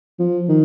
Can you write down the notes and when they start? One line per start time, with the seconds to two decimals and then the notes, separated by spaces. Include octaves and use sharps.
0.19 F3
0.49 D#3